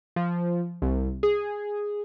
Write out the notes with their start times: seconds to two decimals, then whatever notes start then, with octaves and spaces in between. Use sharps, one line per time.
0.16 F3
0.82 C2
1.23 G#4